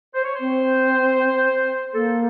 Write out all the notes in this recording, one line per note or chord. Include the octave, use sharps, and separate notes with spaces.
C5
C#5
C5
C4
A#3 A4